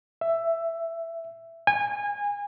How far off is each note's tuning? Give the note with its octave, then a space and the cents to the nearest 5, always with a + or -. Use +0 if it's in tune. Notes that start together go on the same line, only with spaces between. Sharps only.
E5 +10
G#5 -25